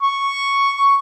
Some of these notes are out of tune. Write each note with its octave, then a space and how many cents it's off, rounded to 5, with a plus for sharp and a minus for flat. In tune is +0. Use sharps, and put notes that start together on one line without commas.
C#6 +0